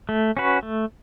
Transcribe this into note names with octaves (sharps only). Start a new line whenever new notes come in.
A3
C#4 F#4 B4
A3